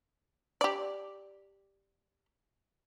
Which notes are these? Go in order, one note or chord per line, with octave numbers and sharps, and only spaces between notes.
G4 D5